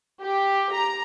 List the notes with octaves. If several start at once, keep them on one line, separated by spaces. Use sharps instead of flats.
G4
A#5